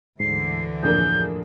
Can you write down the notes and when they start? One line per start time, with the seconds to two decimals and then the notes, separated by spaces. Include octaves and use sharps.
0.20 D2 G#2 D3 E3 C7
0.83 F2 A2 F3 A#3 D4 G#4 G6